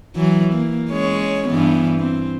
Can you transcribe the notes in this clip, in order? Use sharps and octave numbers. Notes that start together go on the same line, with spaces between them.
E3 F#3
A#3
G#3 C#4 C#5
G2 E3 B3
C4